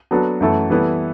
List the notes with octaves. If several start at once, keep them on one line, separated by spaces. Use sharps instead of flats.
F#3 B3 D4 F#4 A4
F#2 E3 A3 E4 A4
E3 G3 B3 E4 A4